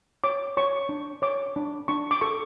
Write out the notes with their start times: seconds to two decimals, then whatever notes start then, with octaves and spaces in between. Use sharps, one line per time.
0.24 C#5 D6
0.57 C#5 C#6
0.89 D4
1.22 C#5 D6
1.56 D4
1.88 D4 C#6
2.11 D6
2.21 A4 C#6